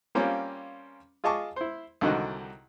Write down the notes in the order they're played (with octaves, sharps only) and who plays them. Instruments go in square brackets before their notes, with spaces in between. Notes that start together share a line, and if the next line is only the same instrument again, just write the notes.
[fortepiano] G3 A#3 C4 C#4 F4
F4 G#4 D#5 A5 C#6 D6
E4 C5
C2 D3 D#3 F#4 D#5